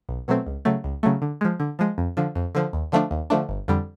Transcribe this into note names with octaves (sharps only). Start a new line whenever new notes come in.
B1
B2 F#3 A3 C4
C#2
C#3 F#3 A3
C#2
C#3 F#3 A3
D3
F3 G#3
D3
F3 G#3
F2
D3 F3
F2
D3 F3
D#2
D3 F3 A3 D4
D#2
D3 F3 A3 D4
G1
F2 D3 G3